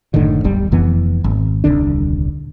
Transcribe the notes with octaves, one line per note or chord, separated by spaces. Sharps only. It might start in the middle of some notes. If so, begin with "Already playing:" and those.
F#1 A2 D3 D#3
D1 G1 G3
F1 F2 E3 B3
G#1
D#1 C2 D3 D4